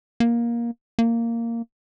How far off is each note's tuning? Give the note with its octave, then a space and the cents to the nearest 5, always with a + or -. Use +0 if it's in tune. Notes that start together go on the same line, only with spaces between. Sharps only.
A#3 +15
A#3 -10